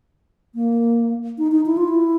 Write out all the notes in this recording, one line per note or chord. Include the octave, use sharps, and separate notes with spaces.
A#3
D#4
D#4
E4
F4
E4